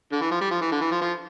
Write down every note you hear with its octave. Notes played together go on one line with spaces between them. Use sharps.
D3
E3
F3
G3
F3
E3
D3
E3
F3
F3